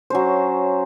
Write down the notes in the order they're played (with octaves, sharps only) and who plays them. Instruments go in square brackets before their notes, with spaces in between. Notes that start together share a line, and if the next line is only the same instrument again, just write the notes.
[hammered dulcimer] F#3 C#4 C5